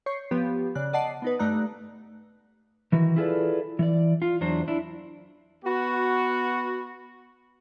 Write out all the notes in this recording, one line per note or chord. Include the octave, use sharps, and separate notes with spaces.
C#5 C#6 G6 C7
F3 B3 G4 B4
C#3 D5 F#6
D5 D#5 F#5 A5 C7
B3 D#4 B4
G2 A3 D#4 D5 A#5 F#6
D#3 E3 F#4
E4 F4 G#4 A4 B4 D5
E3 D5
F4
E2 F#3 D4 C5
D4 E4
B3 F#4